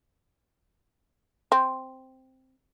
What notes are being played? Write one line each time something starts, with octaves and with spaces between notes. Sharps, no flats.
C4